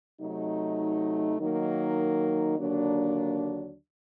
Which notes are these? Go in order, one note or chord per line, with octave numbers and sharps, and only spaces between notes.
C3 F#3 A3 D#4
D#3 F#3 A#3 D#4
D#2 D3 F#3 A#3 D4